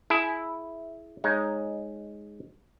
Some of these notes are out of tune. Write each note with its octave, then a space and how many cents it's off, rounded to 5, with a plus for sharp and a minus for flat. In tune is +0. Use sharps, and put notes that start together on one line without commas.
E4 +0 G#4 +25
G#3 +0 D#4 +0 C#5 -15